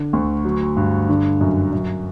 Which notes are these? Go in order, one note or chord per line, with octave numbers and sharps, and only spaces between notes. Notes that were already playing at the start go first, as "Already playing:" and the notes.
Already playing: D3
D2
F#3
G2
D3
F#2
F#2